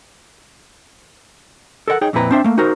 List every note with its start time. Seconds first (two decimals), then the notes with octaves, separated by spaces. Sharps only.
1.88 A4 A#4 C#5 F#5
2.01 D#4 G#4 C#5 G5
2.13 F2 A#2 C4 E4 B4 A#5
2.31 C4 D4 C5 E5
2.44 A3 A#3
2.58 D#4 F#4 A#4 C5